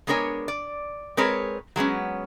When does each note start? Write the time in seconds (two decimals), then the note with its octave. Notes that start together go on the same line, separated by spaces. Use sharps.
0.07 G#3 B3 D4 A#4 C#5 G#5
0.48 D5
1.17 G#3 C4 G#4 A#4 B4 C#5
1.76 F#3 G#3 B3 C#4